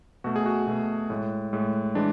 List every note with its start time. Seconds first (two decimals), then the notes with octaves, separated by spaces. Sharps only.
0.24 B2 A3 F#4
0.36 G#4
0.46 F#4
0.67 B2 A3
1.10 A2 G#3
1.53 A2 G#3
1.95 E3 G#3 D4